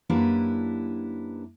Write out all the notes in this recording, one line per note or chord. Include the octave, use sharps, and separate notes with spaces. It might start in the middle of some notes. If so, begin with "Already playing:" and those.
F#2 A#3 D4 E4 G4 B4